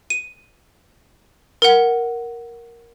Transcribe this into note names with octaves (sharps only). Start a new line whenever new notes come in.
D#7
A#4 F#5